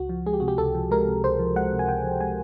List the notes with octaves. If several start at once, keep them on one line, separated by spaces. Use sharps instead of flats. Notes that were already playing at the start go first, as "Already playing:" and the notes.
Already playing: C#2 F#4
F3
G#3 G#4
G4
C3 F#4
G4
C#2 A4
F3
G#3 A#4
C3
C#2 C5
F3
G#3 F#5
C3
G#5
C#2 G5
F3
G#3 G#5